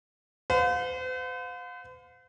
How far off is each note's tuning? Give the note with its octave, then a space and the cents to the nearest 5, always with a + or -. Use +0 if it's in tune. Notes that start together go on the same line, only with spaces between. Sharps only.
C5 -45 F5 +40